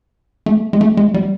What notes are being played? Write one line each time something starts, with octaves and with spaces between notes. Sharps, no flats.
A3
G#3
A3
G#3
G3